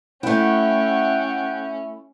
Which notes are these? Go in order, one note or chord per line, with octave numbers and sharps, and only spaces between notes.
A3 C#4 E4 F#5 G5